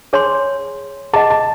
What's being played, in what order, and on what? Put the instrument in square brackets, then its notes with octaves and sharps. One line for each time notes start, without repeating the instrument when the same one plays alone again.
[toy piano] G#4 C#5 G#5 C6
[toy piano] G#4 D#5 F#5 [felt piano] A5
[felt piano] A5